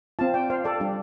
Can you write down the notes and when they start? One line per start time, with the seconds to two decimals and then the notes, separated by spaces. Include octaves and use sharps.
0.19 C4 F4 F5 A5
0.34 D5 G5
0.50 C5 F5
0.64 A4 D5
0.80 G3 D4 G4